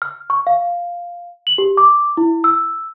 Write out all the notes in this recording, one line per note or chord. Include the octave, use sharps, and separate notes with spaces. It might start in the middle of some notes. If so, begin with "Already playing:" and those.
F6
C#6
F5
F#7
G4
D6
E4
E6